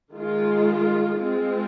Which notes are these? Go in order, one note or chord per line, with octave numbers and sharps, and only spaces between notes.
D#3 G#3 F4
G#3 C4 F4